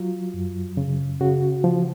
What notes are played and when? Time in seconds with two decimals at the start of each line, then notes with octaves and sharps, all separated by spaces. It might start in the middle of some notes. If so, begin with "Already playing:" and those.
Already playing: F#3 F4
0.34 F#2
0.77 C#3
1.20 C#3 F#4
1.64 F3